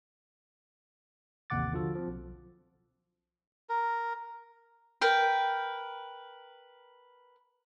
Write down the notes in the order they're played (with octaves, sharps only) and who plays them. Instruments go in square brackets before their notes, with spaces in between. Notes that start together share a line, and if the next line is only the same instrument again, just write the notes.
[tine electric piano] A1 D#2 C3 F#5 D6 A6
D3 F3 F4 F#4 A4
F3 C4
B1
[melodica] A#4
[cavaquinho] A#4 B4 G5